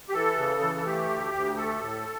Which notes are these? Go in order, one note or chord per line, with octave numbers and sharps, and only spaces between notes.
G4
E3 A4
C#3
E3
A4
A3 G4
D2
D2
A3 A4
A2